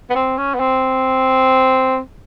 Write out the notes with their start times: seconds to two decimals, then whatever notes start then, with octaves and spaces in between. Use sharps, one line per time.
0.10 B3
0.15 C4
0.37 C#4
0.54 B3
0.60 C4